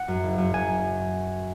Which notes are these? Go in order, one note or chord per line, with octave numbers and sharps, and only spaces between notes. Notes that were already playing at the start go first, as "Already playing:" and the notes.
Already playing: F#5
F#2
F#1
F#2
F#2 G#5